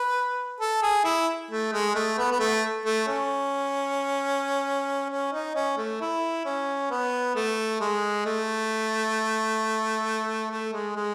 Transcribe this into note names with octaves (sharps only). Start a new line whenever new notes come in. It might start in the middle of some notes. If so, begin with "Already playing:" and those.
Already playing: B4
A4
G#4
E4
A3
G#3
A3
B3
B3
A3
A3
C#4
C#4
D#4
C#4
A3
E4
C#4
B3
A3
G#3
A3
A3
G#3
G#3